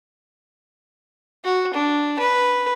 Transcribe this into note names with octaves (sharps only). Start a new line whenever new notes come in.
F#4
D4
B4